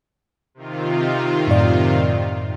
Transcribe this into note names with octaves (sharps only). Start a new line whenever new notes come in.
C3 D#3 F4
F#2 A2 D5